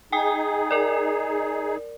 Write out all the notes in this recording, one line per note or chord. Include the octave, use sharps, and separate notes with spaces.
D#4 G#4 G5 G#5 D#6
A#4 D5